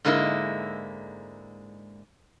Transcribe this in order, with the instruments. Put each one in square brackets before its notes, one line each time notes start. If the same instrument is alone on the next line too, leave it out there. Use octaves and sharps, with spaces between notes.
[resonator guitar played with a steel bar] G#2 D3 G#3 A#3 D#4 E4